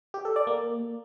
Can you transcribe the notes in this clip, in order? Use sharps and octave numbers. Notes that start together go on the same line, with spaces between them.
G4
A4
D5
A#3